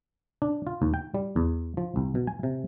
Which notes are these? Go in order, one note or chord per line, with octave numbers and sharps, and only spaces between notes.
D4
F4
D#2
G5
G3
E2
F3
C2
B2
G#5
C3